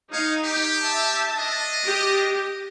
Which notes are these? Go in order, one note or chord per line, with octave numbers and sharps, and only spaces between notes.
D#4 C#5 F5
G4
E5 A5
D4 D#5
G4